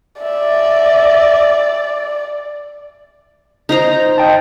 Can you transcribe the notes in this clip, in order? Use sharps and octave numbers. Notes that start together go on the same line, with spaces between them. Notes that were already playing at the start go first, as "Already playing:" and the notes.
D5 E5
D#4 C5 A#5
D#5 G5 A5